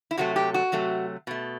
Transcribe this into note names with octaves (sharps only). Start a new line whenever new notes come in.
E4
C3 F#3 A3 F#4
G4
F#4
C3 F#3 A3
B2 A3